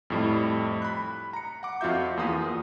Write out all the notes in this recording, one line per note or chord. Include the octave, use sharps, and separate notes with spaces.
F2 A2 G3
B5 F#6
A#5 C#7
F#5 D6
F2 F4 F#4 E5 G6
E2 A#3 F4 D#6